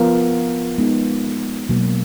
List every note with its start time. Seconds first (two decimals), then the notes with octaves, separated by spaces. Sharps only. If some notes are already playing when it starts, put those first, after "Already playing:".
Already playing: F3 B3 F4 A#4
0.78 G#3 B3 D#4
1.69 B2 F#3 A#3